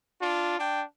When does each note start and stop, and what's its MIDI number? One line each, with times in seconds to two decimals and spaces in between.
0.21 0.55 62
0.21 0.55 65
0.59 0.84 62
0.59 0.84 79